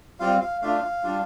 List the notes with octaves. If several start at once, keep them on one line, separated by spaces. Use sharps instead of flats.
G3 C4 F4 F5
F5
A3 D4 F4 F5
G3 D4 F4